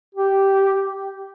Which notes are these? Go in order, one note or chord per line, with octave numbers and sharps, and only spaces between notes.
G4